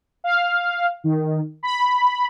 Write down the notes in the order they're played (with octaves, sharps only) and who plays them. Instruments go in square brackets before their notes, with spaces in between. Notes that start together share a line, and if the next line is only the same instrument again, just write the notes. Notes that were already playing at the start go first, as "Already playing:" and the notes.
[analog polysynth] F5
D#3
B5